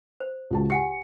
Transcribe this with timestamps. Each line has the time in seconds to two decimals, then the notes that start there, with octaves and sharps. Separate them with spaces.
0.20 C5
0.51 C#2 F#4 A5
0.70 G4 F#5 G#5 C#7